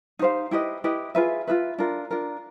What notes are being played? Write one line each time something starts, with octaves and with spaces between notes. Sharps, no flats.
D#4 G4 C5 F5
E4 G4 B4 D#5
E4 G4 B4 D#5
F4 G#4 B4 E5
F4 G#4 B4 E5
D4 F4 A#4
D4 F4 A#4